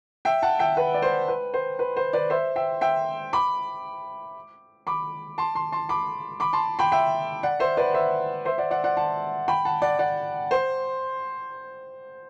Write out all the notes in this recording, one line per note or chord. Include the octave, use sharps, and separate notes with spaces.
E5 G5
F#5 A5
E5 G5
B4
D5
C5
B4
C5
B4
C5
B4 D5
C5 E5
E5 G5
E5 G5
B5 D6
B5 D6
A5 C6
A5 C6
A5 C6
B5 D6
B5 D6
A5 C6
G5 B5
E5 G5
D5 F#5
C5 E5
B4 D5
C5 E5
C5 E5
D5 F#5
D5 F#5
D5 F#5
F#5 A5
G5 B5
F#5 A5
D5 F#5
D5 F#5
C5